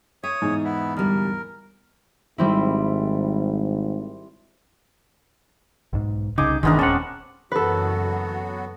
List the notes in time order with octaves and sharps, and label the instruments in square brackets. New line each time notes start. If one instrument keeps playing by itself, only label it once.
[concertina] C#5 D#6 [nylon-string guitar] E5
[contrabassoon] E2 [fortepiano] G#2 D#4 G#4
[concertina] B3 E4
[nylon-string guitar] D2 G3 [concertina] A#4
[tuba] G#1 [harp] G3 C4 E4
[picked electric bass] B1 G#2
[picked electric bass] C2 C#3 [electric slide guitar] D#4 G#4 [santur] D6
[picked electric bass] G1 D4 [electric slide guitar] D#3 E3 [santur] G#3 B3 A#4
[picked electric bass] D#1 [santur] C4 A5 [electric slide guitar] C#4 F#5
[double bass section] F#1 E3 A3 [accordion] F#3 B3 F#4 [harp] A4 B4